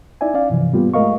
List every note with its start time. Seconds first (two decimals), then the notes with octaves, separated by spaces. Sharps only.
0.21 D#4 E4 D5 E5 G#5
0.34 C#4 D5 F5
0.50 G2 C3 E3 F3
0.73 G#2 G3 A#3 B3 F4 G4
0.94 G#3 A3 A#4 D#5 F5 C#6